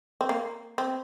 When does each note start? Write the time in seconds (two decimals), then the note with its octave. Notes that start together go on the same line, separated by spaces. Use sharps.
0.21 C4
0.29 A#3
0.78 C4